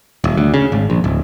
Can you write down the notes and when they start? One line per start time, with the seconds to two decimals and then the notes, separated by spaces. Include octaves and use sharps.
0.24 D#1
0.37 D2
0.54 C#3
0.72 G#1
0.90 A#1
1.04 D1